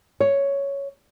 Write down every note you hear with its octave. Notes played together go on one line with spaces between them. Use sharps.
C#5